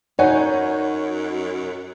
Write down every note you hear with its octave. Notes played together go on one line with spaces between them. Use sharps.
F#2 D#4 B4 C#5 F#5 G#5 G6